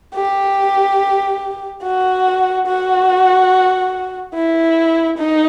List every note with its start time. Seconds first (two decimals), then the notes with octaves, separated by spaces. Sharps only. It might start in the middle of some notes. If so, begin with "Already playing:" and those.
0.15 G4
1.82 F#4
2.66 F#4
4.34 E4
5.18 D#4